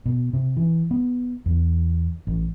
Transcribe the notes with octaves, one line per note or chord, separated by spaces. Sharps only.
B2
C3
E3
B3
E2
A1